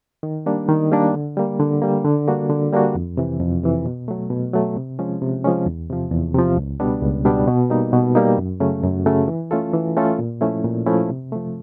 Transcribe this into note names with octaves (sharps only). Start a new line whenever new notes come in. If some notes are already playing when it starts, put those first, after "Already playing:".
D#3
G3 A#3 D4
D#3
G3 A#3 D4
D3
G3 A#3
D3
G3 A#3
D3
G3 A#3 D4 F#4
D3
G3 A#3 D4 F#4
F2
C3 E3
F2
C3 E3
B2
F#3 A3
B2
F#3 A3
C3
F3 G#3 C#4
C3
F3 G#3 C#4
E2
C3 F3
E2
C3 F3
C#2
B2 G3 B3 D4
C#2
B2 G3 B3 D4
B2
G3 A#3 D#4
B2
G3 A#3 D#4
F#2
C#3 F#3 A3 C#4
F#2
C#3 F#3 A3 C#4
E3
A3 C#4 F4 A4
E3
A3 C#4 F4 A4
A#2
F3 A3 C#4 E4
A#2
F3 A3 C#4 E4
C3
F3 A3